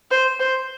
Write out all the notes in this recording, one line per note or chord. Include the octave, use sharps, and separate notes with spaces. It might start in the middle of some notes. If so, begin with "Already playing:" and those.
C5
C5